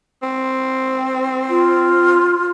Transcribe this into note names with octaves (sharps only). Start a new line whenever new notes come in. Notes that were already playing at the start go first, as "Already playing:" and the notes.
C4
F4